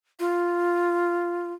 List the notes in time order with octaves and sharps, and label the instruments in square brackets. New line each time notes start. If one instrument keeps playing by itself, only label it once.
[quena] F4